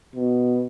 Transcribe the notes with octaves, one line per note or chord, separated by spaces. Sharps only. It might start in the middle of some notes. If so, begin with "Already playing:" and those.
B2